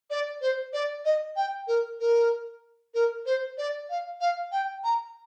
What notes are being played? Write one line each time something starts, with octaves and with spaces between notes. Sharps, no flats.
D5
C5
D5
D#5
G5
A#4
A#4
A#4
C5
D5
F5
F5
G5
A#5